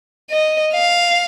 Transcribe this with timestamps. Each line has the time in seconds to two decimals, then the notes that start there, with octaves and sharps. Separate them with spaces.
0.30 D#5
0.74 F5